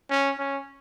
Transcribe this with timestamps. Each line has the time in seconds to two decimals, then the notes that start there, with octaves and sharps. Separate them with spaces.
0.10 C#4
0.39 C#4